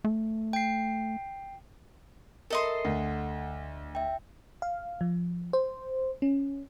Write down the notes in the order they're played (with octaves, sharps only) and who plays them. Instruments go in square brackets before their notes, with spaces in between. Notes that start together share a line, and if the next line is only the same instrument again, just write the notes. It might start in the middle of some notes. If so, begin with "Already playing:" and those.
[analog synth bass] A3
[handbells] G5 C7
[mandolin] A4 D#5 C6 [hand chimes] A#4 E5
[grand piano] D2 [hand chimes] F#5
[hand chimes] E5 G5
[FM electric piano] F5
F3
C5
C#4